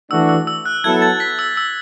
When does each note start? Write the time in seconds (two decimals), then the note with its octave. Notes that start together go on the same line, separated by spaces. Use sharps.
0.11 E3 A3 D4 F#4 E6
0.29 E6
0.47 E6
0.66 F#6
0.84 F#3 B3 E4 A4 G#6
1.02 A6
1.20 B6
1.39 E6
1.57 E6